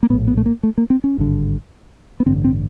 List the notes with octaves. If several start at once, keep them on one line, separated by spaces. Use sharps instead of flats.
A#3
A#1 A2 B3
B3
A3
A#3
A3
A#3
C4
C#4
G#1 G2 D3
B3
A1 G2 D3 C4
C4